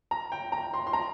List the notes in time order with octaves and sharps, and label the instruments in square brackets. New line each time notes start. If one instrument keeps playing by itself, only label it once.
[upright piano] A#5
G5
A#5
C6
C6
A#5